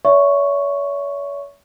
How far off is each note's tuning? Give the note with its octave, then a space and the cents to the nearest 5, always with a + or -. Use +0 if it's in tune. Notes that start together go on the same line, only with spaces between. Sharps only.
C#5 +40 E5 +0 C#6 +0